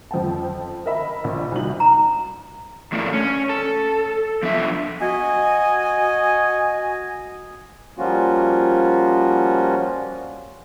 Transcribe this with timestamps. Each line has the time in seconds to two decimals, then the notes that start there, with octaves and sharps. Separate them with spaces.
0.11 F2 F3 G5 A5
0.86 A#4 D#5 E5 B5
1.24 A#1
1.52 C2 D#3 F#4 F#7
1.80 A#5
2.92 E2 A2 E3 A3 A#3 D4
3.13 C#4
3.49 A4
4.43 F3 B3 D4 E5
5.01 F#4 D#5 G#5
7.98 F3 G3 A#3 C#4 F4 F#4